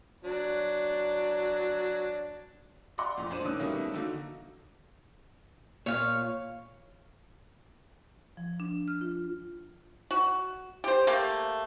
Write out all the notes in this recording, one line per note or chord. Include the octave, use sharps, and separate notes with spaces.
F#3 D4
D5 D#5 F5 F#5 C6 D6
F2 A#2
G#1 D4 C5 D#7 E7
A#2 D#3 C#4 D#6 E6 F#6
B2 D#3 G3 A3 A#3 C#4
D3 D#3 A#3 D#4 F#4
A#2 C#5 F5
F3
D4
F6
F4
F#4
G4 C5
A3 A#3 G4